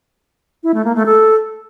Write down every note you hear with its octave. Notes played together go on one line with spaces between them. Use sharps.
E4
A3
A#3
A3
A4